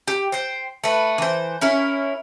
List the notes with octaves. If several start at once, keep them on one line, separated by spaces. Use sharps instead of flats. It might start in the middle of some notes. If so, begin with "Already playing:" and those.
G4
C5 G5
A3 B4
E3 C5
C#4 E4 A#4